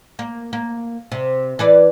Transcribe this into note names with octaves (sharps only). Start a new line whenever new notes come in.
A#3
A#3
C3
E3 B4 D5